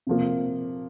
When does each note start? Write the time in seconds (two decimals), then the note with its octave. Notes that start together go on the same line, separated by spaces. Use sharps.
0.07 C3 F3 A#3